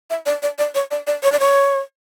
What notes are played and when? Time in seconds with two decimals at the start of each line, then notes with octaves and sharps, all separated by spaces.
0.10 E5
0.26 D5
0.42 D5
0.58 D5
0.75 C#5
0.91 D5
1.07 D5
1.23 C#5
1.32 D5
1.40 C#5